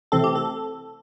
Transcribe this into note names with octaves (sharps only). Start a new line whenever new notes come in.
C3 E3 A3 C4 A4
G4
A4